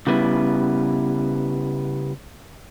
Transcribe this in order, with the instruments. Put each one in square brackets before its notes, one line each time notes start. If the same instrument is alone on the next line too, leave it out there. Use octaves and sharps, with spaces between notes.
[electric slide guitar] C#3 G3 B3 E4